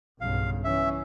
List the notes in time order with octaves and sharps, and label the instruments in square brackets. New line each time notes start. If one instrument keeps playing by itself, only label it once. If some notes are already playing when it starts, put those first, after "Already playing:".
[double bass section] B1 G2 C#3 [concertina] F5
[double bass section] E3 C#4 [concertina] E5